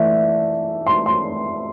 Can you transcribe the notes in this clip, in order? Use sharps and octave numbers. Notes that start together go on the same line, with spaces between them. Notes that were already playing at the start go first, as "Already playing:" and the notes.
Already playing: E3 A3 D5 E5
C6
C6